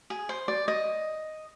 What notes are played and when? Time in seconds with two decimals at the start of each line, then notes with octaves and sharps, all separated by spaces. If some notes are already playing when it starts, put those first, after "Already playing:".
0.10 G#4
0.29 C5
0.48 D5
0.68 D#5